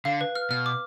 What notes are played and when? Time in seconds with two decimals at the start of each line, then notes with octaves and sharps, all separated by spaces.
0.05 D3 F5
0.21 B4
0.35 F6
0.50 B2 F6
0.66 D6